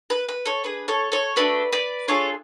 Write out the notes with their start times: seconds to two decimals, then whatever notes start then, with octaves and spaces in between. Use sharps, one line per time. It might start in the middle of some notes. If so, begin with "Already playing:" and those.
0.10 B4
0.29 B4
0.46 A4 C#5
0.64 D4 G#4 B4
0.88 A4 C#5
1.12 A4 C#5
1.36 A3 D4 F#4 A4 B4 D5
1.73 B4 D5
2.08 D4 F4 G#4 A4 C#5